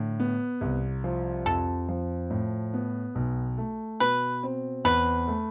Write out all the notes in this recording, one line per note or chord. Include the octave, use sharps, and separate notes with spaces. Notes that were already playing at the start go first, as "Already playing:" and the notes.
Already playing: A2 D3
B3
C2
F3
F2 A4
F3
A2
B3
B1
A3
B2 B4
C4
E2 B4
A3